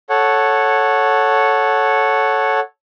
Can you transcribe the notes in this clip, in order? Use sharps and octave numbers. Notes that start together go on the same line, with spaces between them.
A4 C#5 F#5